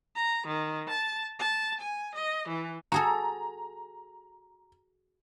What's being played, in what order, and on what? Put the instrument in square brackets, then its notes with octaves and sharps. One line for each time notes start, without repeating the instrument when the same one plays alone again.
[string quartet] A#5
D#3
A5
A5
G#5
D#5
E3
[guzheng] F#4 G#4 A4 [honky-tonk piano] A#5